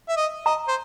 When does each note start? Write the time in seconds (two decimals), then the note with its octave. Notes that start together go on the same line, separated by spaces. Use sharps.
0.09 E5
0.17 D#5
0.46 D#5 A#5
0.68 C5